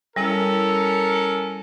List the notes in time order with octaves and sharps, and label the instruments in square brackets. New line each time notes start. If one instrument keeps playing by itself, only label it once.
[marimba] G3 E4 [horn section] C#4 A4 A#4